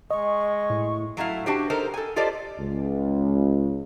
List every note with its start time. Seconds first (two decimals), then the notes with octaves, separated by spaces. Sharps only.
0.11 G#3 D#5 C#6
0.70 A2
1.17 F#3 A3 E4 F5
1.46 D4 F#4 G4 C5
1.70 D#4 A4 A#4 C5
1.94 A4 G#5
2.16 F4 G4 A4 C5 D5 D#5
2.59 C#2